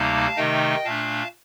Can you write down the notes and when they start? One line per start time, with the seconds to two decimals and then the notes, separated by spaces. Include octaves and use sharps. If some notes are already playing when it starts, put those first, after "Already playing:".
Already playing: D2 C3 G3 A#3 D#4 F5 A5
0.36 C3 D#3 A3 D#4 D#5 G5
0.85 A#2 A3 D4 F5 A5